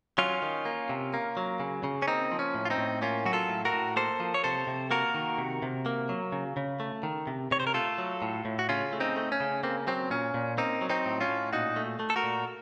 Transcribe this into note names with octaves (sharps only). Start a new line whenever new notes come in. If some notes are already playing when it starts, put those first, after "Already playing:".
F#3 C#4 F4
D#3
A#3
C3
A#3
F#3
C#3
C#3
C#4
A#3 C4 D#4
F3
C#4
A2
F4
C4 D#4
A2
A#3 C#4 F4
F#3 F#4
F4 A4
A2
F#4 A#4
A2
A#3 A4 C5
F3
C#5
C3 A4 C5
C3
A#3 F#4 A#4
D#3
C3
C3
A#3
F#3
C#3
C#3
A3
D#3
C3
C3 C#5
C5
A#4
A3 F4 A4
F#3
A2
A2
F#4
C#3 C#4 F4
A3
C4 D#4
A3
C#4
C#3
A#3 C4
F#3 C4
A#2 C#4
A#2
A#3 C4 D#4
F#3
C4 D#4
A2
C#4 F4
A2
A#2 D#4 F#4
A3
A3
A4
F#4 A#4
A#2